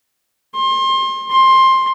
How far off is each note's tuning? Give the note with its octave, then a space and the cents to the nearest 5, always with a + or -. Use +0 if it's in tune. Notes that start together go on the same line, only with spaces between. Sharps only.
C6 +30
C6 +15